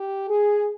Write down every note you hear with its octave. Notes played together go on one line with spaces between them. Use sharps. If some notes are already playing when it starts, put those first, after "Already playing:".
Already playing: G4
G#4